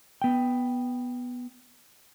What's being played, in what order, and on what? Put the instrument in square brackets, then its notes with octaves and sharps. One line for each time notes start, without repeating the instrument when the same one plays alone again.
[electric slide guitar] B3 G5